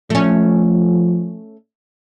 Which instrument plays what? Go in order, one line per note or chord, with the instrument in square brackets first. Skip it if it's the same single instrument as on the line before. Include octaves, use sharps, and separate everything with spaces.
[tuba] F3 [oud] A3 C#4